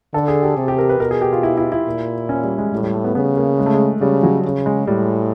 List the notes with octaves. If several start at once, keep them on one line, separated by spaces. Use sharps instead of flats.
D3 A4
G#4
G4
C3
G4
A#4
B4
B2 A#4
G#4
G4
F4
E4
E4
E4
A#2
C#4
G3
G#3
A2 G3
G3
A3
B3
C#3 B3
A#3
G#3
A3
G#3
C#3 G3
F#3
C#3
G#3
A2 G3